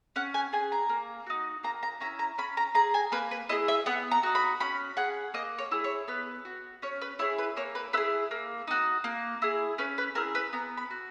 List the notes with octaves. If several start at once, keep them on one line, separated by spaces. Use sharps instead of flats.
C#4 F#5
G#5
G#4 G#5
A#5
A#3
D#4 F#4
A#3 A#5
A#5
C#4 E4 A#5
A#5
C#4 B5
A#5
G#4 A#5
G#5
A#3 B4
B4
E4 G#4 D#5
E5
B3 F#5
A#5
D#4 F#4
B5
C#4 B5
G#4 F#5
A#3 D#5
C#5
E4 G#4
C#5
B3 B4
F#4
C#4 C#5
B4
E4 G#4 C#5
B4
A#3 C#5
B4
E4 G#4 B4
A#3
D#4 F#4
A#3
E4 G#4
C#4 B4
B4
E4 G#4 A#4
B4
B3 A#5
B5
F#4